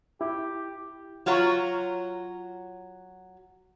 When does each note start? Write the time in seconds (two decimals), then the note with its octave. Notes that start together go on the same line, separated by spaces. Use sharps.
0.21 E4 G4
1.26 F#3 F4 F#4 C#5 A#5